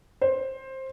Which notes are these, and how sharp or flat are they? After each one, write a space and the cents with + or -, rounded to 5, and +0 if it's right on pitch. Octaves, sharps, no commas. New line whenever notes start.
C5 +15